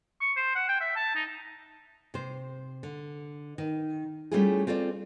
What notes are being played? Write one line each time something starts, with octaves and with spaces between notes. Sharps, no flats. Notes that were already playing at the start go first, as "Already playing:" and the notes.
C#6
C5
F#5
G5
E5
A5
D#4
C3 C5
D3
D#3
G3 A3 C#4 E4 F4 G#4
C4 F4 A4 C5 D5